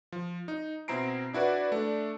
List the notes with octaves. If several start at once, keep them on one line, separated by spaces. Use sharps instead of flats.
F3
D#4
B2 C4 E4 A#5 C7 D7
D4 E4 F#4 B4 D5
A3 D4